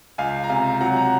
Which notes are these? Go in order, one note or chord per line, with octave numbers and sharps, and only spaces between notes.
C#2 F5 G#5
A#5
C3 F5 G#5
F#3 F#5 A#5
F#5 A#5